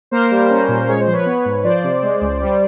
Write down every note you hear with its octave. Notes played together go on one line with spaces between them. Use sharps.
A#3 A#4 C5
G3
C#4
A#2
G#3 C#5
C5
F3
B4 C#5
B3
G#2
F3 C5 D5
C3
G#3
C#2
G3